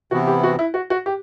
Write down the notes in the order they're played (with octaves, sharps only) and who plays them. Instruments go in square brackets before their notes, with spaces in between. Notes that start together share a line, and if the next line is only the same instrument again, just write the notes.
[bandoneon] C3 E3 B3 E4 [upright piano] F#4
[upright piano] G4
F#4
E4
F#4
F#4
G4